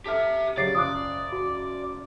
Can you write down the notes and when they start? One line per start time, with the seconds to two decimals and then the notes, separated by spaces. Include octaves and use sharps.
0.06 G4 A4 E5 F6
0.57 C#3 F#3 G4 D5 A6 C7
0.75 F#1 F4 D6 D#6 F#6
1.32 F#4